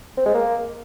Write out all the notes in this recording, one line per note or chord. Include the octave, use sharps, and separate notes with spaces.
C4
G#3
A#3